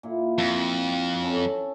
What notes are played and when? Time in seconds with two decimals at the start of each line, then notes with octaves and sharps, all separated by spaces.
0.03 A#2 E4
0.38 F2
1.22 C#4 A4